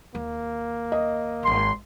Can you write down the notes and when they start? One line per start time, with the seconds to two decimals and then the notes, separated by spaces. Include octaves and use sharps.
0.15 D#2 A#3
0.92 D#5
1.43 D#1 G#1 C6